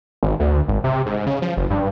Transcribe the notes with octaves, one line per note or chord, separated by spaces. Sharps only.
G#1
D2
G#1
C3
G#2
C#3
F3
F#1
G2